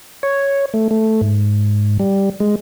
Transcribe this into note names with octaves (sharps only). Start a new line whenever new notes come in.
C#5
A3
A3
G#2
G3
G#3